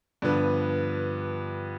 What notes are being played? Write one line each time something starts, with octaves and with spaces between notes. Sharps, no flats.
G2 D3 F3 B3